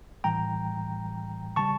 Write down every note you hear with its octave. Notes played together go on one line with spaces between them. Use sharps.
A2 E3 G3 G5 A#5
C#3 G3 A5 C#6